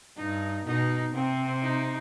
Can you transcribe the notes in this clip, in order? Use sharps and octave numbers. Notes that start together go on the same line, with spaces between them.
G2 D#4
B2 D#4
C3 C4
D#4